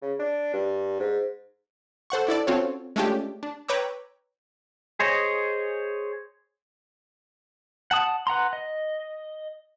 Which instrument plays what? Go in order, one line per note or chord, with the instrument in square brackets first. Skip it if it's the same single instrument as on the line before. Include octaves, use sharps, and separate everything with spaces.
[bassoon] C#3
D4
G2
G#2
[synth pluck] A4 C5 F#5 C#6
D4 E4 A4 D5
C4 C#4 F4 F#4 A4 C#5
G#3 A3 C#4 D4 F4 G4
D4
B4 C#5 G5 A#5 D6 E6
[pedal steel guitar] G#4 C5 C#5 D#5
F#5 A5 D#6
B4 F#5 A#5 C6
D#5